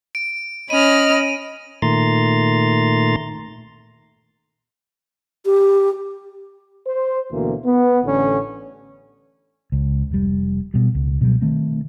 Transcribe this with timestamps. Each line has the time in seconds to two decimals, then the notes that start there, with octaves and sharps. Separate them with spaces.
0.15 D7
0.70 C#4 D#5 B5 F6 D#7
1.82 A#2 D#3 A3 A#5 C6 A6
5.46 G4
6.87 C5
7.32 D2 B2 E3 A#3
7.66 B3
8.04 A1 A2 D3 C#4
9.72 C#2
10.11 F1 G3
10.74 B2 G3
10.95 C#2
11.21 B2 F#3 G3
11.41 D#3 A3 C4